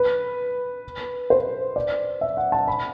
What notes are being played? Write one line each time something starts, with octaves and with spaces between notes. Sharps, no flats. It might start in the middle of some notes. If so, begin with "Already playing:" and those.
Already playing: B4
C5
D5
E5
F#5
A5
B5